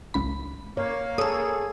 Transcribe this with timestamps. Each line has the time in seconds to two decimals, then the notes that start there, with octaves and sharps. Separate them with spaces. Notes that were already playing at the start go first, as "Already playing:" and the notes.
0.14 G#1 C#2 B5
0.77 A#3 C#5
1.18 G#4 A4 C#5 D#6 E6